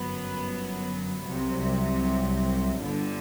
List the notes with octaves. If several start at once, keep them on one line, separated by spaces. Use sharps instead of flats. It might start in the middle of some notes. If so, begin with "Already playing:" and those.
Already playing: G1 F#2 F#3 B3
C2 C3 F#3
G1 G2 D3